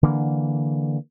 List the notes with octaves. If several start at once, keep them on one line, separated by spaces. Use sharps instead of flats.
D3 E3 A#3